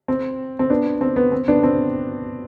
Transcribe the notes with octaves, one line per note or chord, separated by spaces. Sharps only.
C4
C4
B3 D4
C4
B3
C4
B3 D4
C4